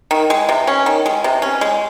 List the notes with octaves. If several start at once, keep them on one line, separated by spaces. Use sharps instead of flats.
D#3
G#3
C3
C#4
D#3
G#3
C3
C#4
G#3